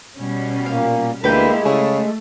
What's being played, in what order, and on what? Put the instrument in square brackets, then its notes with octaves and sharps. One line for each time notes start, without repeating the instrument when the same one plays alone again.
[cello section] B2 G3 C#4
[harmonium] A#2 A#3 [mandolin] F5
[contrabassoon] D2 [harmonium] G#3 [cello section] A#3 E4 G4 [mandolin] B4 G5 B5
[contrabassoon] C#3 [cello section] A3 [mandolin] G#4